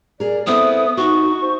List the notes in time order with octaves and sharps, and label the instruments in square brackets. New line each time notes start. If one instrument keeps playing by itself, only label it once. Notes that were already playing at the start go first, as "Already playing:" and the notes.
[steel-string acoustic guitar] G#4 A#4 [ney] D5
[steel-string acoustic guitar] B3 C4 E4 [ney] A4 [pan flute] D#6
[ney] D#4 [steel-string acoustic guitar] F#4 [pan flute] C#6
[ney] C5